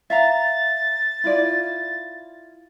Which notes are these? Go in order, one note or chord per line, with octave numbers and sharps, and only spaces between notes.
E5 F5 A#5 A6
E4 F4 D5